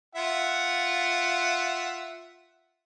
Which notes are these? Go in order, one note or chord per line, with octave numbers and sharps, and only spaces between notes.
F4 E5 F#5